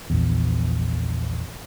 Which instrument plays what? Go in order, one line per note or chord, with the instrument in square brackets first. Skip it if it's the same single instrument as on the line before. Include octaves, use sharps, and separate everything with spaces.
[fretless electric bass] A#1 E2